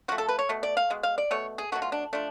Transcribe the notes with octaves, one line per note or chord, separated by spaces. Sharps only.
F3 A3 F#4
A4
B4
C#5
B2 A3
D5
F5
B2 G#3
F5
D5
B2 A3 C#5
G#4
B2 F#3 A3 F#4
F4
D4
F3 A3 D4